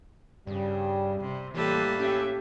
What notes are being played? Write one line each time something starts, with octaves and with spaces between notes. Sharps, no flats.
G2 C#3 G3
C3
A2 E3 G3 A#3 A4 B4
C#4 G4 E5